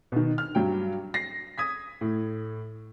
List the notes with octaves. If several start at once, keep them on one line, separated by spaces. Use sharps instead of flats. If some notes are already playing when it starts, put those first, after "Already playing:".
B2 D#3
F6
G2 F#3 G5
A#6 C7
D#6 G#6 B6
A2